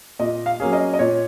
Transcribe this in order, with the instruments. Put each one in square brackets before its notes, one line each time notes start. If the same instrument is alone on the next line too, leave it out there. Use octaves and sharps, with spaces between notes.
[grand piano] A#2 [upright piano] D#5
[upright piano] F5
[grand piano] F#3 A#3 C#4 G#4
[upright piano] D#5
D#5
[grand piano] A#2 [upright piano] C#5